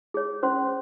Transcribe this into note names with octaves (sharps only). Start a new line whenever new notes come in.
G#4 C#5
C#4 C5 C6